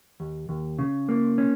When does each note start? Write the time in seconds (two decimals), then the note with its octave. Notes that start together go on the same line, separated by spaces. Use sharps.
0.20 D#2
0.49 D#2
0.79 C#3
1.09 A#3
1.38 C#4